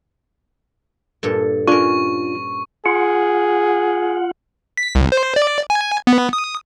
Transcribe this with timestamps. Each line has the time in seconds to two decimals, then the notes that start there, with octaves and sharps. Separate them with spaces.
1.23 G2 A#2 A4
1.67 C#4 D4 F4 A#4 C#6
2.86 F4 G#4 F#5
4.77 B6
4.95 C2
5.12 C5
5.36 D5
5.70 G#5
6.07 B3
6.33 D#6